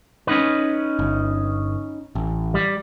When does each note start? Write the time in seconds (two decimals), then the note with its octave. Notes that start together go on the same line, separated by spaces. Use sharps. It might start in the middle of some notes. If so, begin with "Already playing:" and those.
0.27 C#4 D#4 B4
0.99 G1
2.15 A1
2.54 G3